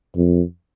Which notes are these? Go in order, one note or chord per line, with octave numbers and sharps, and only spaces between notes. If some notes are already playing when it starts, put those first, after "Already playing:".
F2